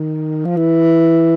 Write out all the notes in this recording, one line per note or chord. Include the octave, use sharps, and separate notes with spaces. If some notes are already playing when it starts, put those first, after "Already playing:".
Already playing: D#3
F3
E3